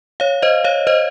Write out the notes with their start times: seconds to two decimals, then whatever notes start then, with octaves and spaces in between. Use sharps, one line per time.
0.20 C#5 F5
0.42 C5 D#5
0.64 C#5 F5
0.87 C5 D#5